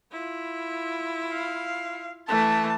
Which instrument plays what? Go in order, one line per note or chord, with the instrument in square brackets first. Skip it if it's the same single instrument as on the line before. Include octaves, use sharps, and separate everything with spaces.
[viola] E4 F4
[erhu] F5
[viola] E3 A3 [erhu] A5